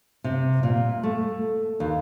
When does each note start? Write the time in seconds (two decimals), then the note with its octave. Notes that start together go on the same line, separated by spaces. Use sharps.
0.24 C3
0.63 A#2
1.03 A3
1.80 D#2